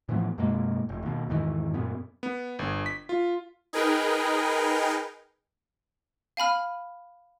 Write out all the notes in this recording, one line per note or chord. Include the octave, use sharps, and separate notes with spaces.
A2 E3 F3 B3
F#2 B2 G#3 A#3
F1
D#2 B2
E2 G#2 D#3 E3
F#2 A#2 B3
B3
G1
B6
F4
D#4 G#4 A#4 B4 G5
F5 G#5 B5 F6